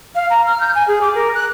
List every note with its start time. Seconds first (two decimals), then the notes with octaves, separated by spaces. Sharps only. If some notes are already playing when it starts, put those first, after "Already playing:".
0.15 F5
0.30 A#5
0.46 F6
0.61 G6
0.75 G#5
0.88 G#4
1.02 D6
1.15 A#4
1.35 F#6